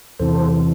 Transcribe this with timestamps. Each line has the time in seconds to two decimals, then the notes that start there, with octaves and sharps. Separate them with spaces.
0.19 E2 C3 E3 A4 C5